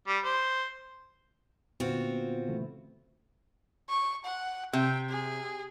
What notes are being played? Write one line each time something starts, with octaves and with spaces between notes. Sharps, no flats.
G3
C5
A#2 D3 B3 C4 F4 F#4
C#3 E3 A3 E4
C#6
F#5
C3 G5
G#4